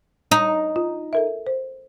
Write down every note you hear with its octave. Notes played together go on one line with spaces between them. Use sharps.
D#4
F4
A4 A#4 E5
C5